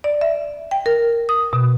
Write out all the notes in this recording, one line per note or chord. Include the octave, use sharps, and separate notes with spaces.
D5
E5
G5
A#4
D#6
B2